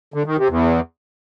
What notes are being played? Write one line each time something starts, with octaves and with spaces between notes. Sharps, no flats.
D3
D#3
C3
E2